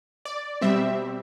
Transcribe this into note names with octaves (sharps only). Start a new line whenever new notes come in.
D5
B2 G3 C4 E5